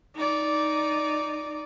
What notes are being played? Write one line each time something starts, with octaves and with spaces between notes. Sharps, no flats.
D#4 D5